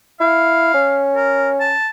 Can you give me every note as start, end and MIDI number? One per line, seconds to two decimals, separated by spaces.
0.20 0.72 64
0.20 1.05 77
0.74 1.74 61
1.16 1.49 70
1.60 1.89 81